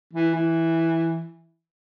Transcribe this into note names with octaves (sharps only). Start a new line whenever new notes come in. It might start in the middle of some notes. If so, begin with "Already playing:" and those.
E3
E3